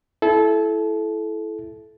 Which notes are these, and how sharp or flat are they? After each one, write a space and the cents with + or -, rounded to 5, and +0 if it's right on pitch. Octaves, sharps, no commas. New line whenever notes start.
E4 +10 A4 -25